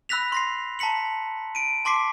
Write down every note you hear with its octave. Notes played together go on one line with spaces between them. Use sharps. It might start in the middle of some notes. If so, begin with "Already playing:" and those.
B5 E6 F#6 A#6 B6 F7
C6 A#6 C7
A5 A#5 B6 C#7 F#7
D7 D#7
A5 C6 D6 B6 C7